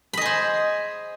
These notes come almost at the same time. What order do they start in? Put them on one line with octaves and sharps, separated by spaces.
B5 D#5 G#4 C5